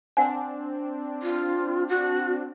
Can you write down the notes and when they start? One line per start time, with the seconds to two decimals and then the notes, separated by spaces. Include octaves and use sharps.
0.17 C4 D4 F#5 G#5
1.23 F4
1.88 F#4